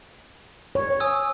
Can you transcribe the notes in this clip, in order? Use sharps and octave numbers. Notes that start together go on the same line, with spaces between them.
C#5
G#5 D#6 E6